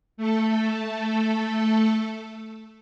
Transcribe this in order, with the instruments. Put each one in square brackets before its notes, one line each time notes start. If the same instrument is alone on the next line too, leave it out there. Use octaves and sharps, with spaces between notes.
[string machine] A3 A4